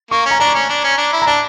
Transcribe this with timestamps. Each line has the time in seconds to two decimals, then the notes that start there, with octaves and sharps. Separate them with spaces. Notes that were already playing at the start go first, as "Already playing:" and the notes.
0.11 A#3 C#6
0.26 C#4 A#5
0.40 D4 A#5
0.55 C#4
0.69 D4
0.84 C#4
0.98 D4
1.12 E4
1.22 A#5
1.27 D4 A5